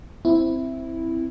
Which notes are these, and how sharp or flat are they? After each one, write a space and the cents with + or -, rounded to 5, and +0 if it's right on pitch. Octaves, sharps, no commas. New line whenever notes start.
C4 +0 E4 +0